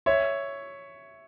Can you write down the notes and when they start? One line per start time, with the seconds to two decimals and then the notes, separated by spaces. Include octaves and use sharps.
0.06 C#5 E5